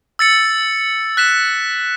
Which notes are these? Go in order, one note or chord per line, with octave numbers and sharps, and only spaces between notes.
E6 A6 C#7
F#6 B6 E7